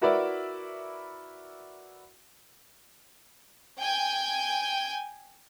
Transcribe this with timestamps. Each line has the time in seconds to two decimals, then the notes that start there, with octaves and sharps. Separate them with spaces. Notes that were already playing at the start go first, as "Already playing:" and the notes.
0.01 E4 F#4 A#4 B4 D5 E5
3.80 G5 G#5 G6